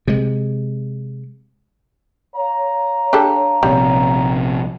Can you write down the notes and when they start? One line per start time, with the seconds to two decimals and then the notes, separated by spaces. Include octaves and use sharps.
0.07 C3 G#3
2.35 C#5 F5 A#5
3.13 D4 G4 A4
3.63 A#1 C3 G3